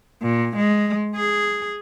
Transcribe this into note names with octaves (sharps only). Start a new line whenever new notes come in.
A#2
G#3
G#4